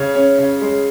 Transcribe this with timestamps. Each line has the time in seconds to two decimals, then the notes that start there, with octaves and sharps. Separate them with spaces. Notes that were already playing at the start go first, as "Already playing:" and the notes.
Already playing: C#3 C#5
0.15 C#4
0.38 C#3
0.62 G#3